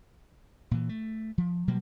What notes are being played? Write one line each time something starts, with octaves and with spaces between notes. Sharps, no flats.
A#2 E3
A3
F3
B2 F#3 G3 A#3